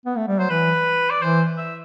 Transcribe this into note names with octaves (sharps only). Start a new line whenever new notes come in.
B3
A3
G3
F#3 C5
E3 B4
D5
E3 C5
E5